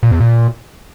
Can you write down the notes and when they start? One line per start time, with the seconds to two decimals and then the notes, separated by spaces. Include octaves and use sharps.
0.03 A#2
0.11 E2
0.20 A#2